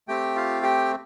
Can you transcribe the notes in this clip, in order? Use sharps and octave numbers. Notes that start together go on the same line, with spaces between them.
A3 C4 G4 G5
F4 F5
G4 G5